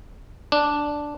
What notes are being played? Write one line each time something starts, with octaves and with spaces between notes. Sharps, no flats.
D4